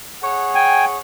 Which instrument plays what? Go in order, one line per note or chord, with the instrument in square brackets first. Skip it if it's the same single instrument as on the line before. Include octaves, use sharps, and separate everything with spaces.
[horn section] G#4 C#5 F#5
[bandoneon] G5 G#5